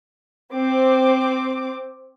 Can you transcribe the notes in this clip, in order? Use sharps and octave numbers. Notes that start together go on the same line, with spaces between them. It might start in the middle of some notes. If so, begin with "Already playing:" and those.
C4 D6